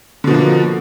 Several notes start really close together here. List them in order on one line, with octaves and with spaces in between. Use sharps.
D3 B2 F3 A#3